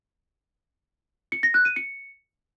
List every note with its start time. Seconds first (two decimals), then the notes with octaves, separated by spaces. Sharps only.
1.32 C#7
1.43 A#6
1.54 F#6
1.65 D#7
1.76 C#7